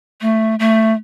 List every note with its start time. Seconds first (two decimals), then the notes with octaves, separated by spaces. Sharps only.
0.21 A3
0.59 A3